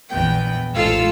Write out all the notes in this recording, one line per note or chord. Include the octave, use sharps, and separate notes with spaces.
A#1 E2 B3 G5
A1 G#2 F4 A4 F5 E6